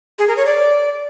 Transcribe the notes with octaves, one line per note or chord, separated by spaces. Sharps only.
G#4
A#4
C#5
D5